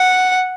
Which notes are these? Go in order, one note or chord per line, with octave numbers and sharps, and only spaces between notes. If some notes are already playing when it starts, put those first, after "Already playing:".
Already playing: F#5